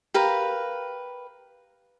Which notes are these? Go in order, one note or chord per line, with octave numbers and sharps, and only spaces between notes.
G4 A#4 B4 F5